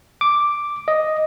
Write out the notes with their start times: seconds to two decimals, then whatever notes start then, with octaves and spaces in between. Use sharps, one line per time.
0.21 D6
0.88 D#5